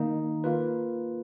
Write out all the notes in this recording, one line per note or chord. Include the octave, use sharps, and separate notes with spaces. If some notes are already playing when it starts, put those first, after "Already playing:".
Already playing: D#3 A#3 D#4
A#3 F4 B4